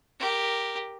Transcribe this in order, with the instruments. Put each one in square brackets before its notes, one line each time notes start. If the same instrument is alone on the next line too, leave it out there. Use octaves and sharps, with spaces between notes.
[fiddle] G4 A#4